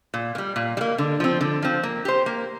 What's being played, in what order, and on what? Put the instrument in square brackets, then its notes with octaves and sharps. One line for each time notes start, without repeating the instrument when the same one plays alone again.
[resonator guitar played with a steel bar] A#2
A#3
G3
A#2
G3
A#3
D3
F3 C4
D3
F3 C4
A#3
G4 C5
A#3